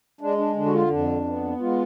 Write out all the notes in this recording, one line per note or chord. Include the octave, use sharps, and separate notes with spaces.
G#3 D4
D4
D3 D4
F#4
F4
F2 D4
B3
G#3 F4